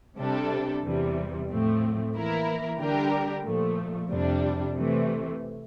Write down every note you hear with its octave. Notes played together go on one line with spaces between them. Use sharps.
C3 G3 D4 A4
E2 C3 E3 G3
A2 F3 A3 C4
E3 A#3 E4 A#4
D3 G3 D4 G4 A#4
A#2 F3 A3
F2 C3 G3 D4
C3 E3 A3